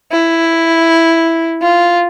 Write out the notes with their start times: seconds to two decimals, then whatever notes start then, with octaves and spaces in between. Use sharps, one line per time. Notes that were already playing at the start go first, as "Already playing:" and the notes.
0.12 E4
1.62 F4